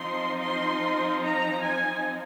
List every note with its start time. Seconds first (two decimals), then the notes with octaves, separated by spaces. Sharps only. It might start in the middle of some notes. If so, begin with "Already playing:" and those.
Already playing: F3 C4 D#4 C6
0.40 C6
1.23 A#5
1.64 G#5